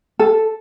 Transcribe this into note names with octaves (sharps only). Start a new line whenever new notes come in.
A4